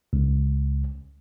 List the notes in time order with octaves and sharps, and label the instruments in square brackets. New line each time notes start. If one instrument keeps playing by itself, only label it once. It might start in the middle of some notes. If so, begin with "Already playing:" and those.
[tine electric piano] C#2